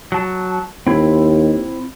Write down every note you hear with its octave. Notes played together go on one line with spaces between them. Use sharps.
F#3 A5
D#2 C4 E4